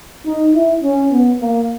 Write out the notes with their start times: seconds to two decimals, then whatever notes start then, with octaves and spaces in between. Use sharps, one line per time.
0.26 D#4
0.55 E4
0.83 C#4
1.12 B3
1.40 A#3